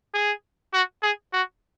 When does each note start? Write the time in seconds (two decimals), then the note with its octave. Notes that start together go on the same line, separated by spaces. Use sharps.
0.14 G#4
0.73 F#4
1.03 G#4
1.33 F#4